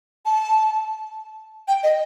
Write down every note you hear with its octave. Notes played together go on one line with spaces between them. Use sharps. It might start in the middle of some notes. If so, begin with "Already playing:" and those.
A5
G5
D#5